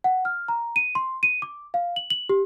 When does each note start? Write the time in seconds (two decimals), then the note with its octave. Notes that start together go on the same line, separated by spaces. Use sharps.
0.04 F#5
0.25 F6
0.48 A#5
0.76 D#7
0.95 C6
1.23 D#7
1.42 D6
1.74 F5
1.96 F#7
2.10 F#7
2.29 G4